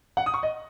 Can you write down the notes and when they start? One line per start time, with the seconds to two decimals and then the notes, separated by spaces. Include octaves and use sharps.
0.17 F#5
0.26 D#6
0.34 C#6
0.43 D#5